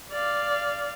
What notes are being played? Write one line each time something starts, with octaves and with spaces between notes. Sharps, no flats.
D5 F5